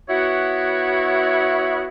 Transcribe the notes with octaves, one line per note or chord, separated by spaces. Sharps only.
B3 E4 F#4 C#5